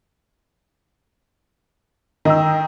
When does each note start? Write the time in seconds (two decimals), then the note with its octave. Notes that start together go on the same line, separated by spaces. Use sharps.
2.25 D#3 D#5 G5 A#5 E6